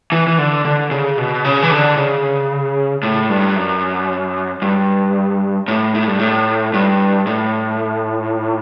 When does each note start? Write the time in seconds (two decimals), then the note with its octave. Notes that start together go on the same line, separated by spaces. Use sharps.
0.12 E3
0.27 E3
0.38 D3
0.65 D3
0.91 C#3
1.18 B2
1.44 C#3
1.62 E3
1.71 D3
1.97 C#3
3.03 A2
3.29 G2
3.56 F#2
4.62 G2
5.68 A2
5.95 A2
6.07 G2
6.19 A2
6.74 G2
7.27 A2